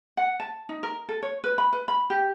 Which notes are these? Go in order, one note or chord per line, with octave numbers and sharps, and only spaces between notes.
F#5
A5
D#4
A#4
A4
C#5
B4
B5
B4
B5
G4